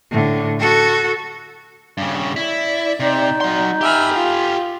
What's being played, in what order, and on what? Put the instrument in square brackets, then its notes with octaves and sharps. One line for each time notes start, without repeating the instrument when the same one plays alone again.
[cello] A2 D3
F#4 A4
[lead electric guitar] G2 C#3
[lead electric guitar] E4 [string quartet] D5
[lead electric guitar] C3 [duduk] D#4
[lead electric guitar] F#3 C6
[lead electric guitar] G4 G#5 [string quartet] E5 B5 F6
[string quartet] F4